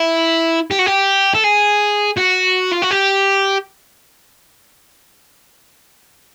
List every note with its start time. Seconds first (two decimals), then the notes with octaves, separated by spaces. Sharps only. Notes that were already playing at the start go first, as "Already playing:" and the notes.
Already playing: E4
0.71 G4
0.79 F#4
0.86 G4
1.35 A4
1.44 G#4
2.18 F#4
2.72 F4
2.82 F#4
2.91 G4